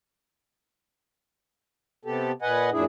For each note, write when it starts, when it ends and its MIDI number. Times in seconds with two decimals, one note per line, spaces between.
2.05 2.32 48
2.05 2.32 59
2.05 2.32 67
2.05 2.32 69
2.42 2.70 46
2.42 2.70 71
2.42 2.70 75
2.42 2.70 78
2.42 2.70 80
2.72 2.84 42
2.72 2.84 46
2.72 2.84 62
2.72 2.84 64
2.72 2.84 68